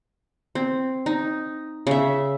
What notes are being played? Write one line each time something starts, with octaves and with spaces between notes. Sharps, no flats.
C4
D#4
C#3 E5